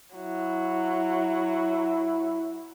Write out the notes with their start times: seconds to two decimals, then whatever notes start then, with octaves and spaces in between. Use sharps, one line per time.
0.15 F#3 E4